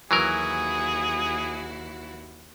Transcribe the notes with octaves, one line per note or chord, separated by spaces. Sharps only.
D#2 E3 F#3 E4 F#4 G#4 A#4